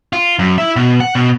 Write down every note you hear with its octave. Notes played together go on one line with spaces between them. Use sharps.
F4
F#2
E4 E5
B2
F#5
B2